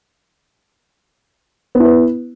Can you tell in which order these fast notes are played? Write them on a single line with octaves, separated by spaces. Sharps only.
B3 E4 B4